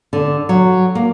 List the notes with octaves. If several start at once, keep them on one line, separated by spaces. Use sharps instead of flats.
D3
F#3
A#3